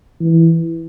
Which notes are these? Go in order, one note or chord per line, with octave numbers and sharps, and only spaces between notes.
E3